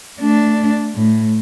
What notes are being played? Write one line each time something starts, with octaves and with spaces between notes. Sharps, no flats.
A3 D4
A2